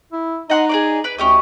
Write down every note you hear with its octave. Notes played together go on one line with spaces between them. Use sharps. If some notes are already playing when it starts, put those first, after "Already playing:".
E4
D#4 D#5 F#5 C6
G#4 C5 D5
B4 D5
D2 C#4 G4 D#5